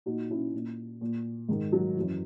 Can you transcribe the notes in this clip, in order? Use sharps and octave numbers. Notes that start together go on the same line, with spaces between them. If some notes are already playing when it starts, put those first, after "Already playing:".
A#2 D#4 F#4
C#4 E4
A#2
A#2
G#2 D#3
F#3
F#2 E3